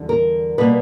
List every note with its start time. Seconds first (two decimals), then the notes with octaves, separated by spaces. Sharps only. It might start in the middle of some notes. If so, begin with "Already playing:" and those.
Already playing: E2 D3 G3
0.09 A#4
0.58 B2 G3 A#3 B4